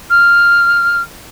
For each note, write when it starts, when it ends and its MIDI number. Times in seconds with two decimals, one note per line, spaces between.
0.10 1.02 89